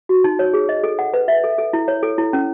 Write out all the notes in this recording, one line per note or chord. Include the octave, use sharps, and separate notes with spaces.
F#4
D#4
C#5
G#4
D#5
A4
F#5
B4
E5
A4
A4
E4
C#5
A4
E4
C#4